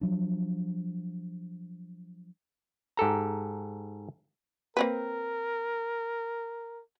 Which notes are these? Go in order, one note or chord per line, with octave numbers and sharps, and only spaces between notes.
F3 F#3 D4
G#2 G4 A4 A#5
A#3 C4 A#4 B4